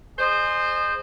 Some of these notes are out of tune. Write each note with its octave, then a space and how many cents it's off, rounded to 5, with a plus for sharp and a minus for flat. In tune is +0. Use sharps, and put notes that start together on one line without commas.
G#4 +0 C5 +0 D#5 -30